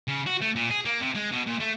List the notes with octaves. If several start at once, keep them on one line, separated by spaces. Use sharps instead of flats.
C#3
F#4
A3
A#2
G#4
A#3
C3
G#3
B2
A#2
A3